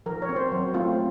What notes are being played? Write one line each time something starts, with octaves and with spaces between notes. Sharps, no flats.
F3 A#4
C#5
C4
C5
F#3
A3 C4 F4